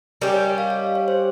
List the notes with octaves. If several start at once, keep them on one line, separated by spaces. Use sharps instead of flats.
G3 C#4 G4 A#4
C#5
D#5
F5
F5
C#5
C5